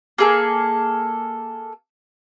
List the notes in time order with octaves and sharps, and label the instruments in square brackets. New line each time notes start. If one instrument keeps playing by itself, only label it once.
[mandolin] A#3 G#4 A4